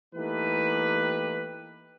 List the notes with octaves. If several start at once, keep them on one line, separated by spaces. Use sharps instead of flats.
E3 A3 A#3 D#4 G4 B4